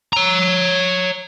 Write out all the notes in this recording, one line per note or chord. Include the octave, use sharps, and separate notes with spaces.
C#5 A#5